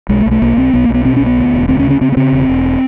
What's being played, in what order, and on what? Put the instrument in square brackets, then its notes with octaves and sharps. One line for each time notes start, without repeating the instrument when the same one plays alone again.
[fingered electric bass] B1 G#3
A3
B1
A3
B1 A#3
B1 C4
B1 B3
A#3
B1
B3
B2 C4
B1 C#4
B3
D2
E1
D2 C4
C#4
C#3
C#4
C#3 C4
B3
C#3 C4
E1
E1